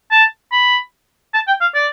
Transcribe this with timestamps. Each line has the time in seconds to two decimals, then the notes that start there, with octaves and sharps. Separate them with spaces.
0.11 A5
0.52 B5
1.34 A5
1.47 G5
1.61 F5
1.75 D5